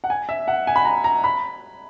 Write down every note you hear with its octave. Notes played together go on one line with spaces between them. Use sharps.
F#5
G#5
E5
F#5
G#5
B5
A#5
A#5
B5